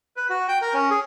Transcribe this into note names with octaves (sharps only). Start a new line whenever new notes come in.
B4
F#4
G5
A#4
C#4
G#4